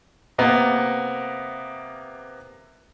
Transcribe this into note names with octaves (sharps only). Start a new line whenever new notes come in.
C3 A#3 B3